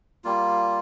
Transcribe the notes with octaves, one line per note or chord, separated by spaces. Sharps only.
G3 A#3 F4